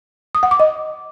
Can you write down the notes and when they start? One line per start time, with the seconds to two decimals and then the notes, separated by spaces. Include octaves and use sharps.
0.35 D#6
0.43 F#5
0.51 D6
0.60 D#5